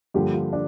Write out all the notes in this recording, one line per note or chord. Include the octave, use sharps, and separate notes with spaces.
G2 D3 F3 A#3 G4
F4
D4